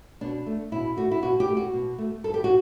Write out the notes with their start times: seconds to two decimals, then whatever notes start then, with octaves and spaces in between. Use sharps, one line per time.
0.21 B2 D4
0.46 A3
0.72 B2 E4
0.97 A3 F#4
1.11 E4
1.22 B2 F#4
1.40 G4
1.48 A3
1.57 F#4
1.74 B2
1.98 A3
2.24 G2 A4
2.34 G4
2.44 F#4